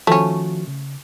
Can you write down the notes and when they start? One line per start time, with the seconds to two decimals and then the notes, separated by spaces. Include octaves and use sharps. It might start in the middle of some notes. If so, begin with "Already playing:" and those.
0.07 D#3 F3 A3 C#4 F#4
0.68 C#3